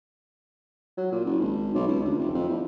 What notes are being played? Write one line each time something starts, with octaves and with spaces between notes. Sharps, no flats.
F#3
A#2
F#1
G#1
B1
C#2
D2
F1
F2
E2